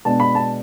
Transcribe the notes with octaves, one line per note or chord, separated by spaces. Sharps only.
B2 G#3 B3 D4 A5
B5
A5